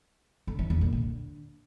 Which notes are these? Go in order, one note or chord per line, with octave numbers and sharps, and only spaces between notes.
D3
E3
E2
A#2
D3